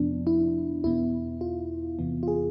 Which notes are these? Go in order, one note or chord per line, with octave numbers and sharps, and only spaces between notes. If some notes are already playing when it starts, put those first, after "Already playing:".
Already playing: F2 C3 F3 B3 D4
E4
E2 B2 B3 E4
F4
E2 C3 E3 B3
F4
G#4